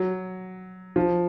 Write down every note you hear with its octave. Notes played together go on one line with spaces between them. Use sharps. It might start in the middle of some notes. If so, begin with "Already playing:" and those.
Already playing: F#3
F3